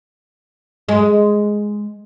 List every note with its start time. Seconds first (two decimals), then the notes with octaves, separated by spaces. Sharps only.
0.89 G#3